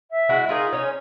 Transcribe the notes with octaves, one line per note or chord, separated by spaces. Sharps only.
E5
G#3 E4 F#4
D#4 F4 G#4 A#4
C#4 C#5